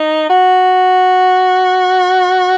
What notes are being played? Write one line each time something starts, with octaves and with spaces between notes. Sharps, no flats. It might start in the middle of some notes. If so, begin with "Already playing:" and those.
Already playing: D#4
F#4